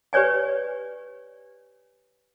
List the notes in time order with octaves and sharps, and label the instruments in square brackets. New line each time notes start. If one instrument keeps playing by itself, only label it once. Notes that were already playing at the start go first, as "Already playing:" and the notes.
[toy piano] G4 B4 C#5 D5 G#5